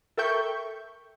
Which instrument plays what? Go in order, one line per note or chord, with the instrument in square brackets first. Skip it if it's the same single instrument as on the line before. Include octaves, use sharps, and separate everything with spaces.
[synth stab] A4 A#4 E5 G5 C#6 G6